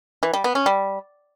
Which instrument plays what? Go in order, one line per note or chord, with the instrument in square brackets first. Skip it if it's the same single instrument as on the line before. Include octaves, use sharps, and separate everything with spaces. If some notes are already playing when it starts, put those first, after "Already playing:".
[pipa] E3
G3
B3
C#4
G3